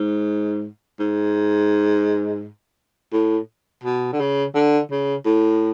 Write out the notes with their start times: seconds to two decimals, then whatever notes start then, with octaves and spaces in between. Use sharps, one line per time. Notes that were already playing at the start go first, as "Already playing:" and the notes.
Already playing: G#2
1.00 G#2
3.13 A2
3.84 B2
4.13 D3
4.20 C#3
4.55 D3
4.91 C#3
5.25 A2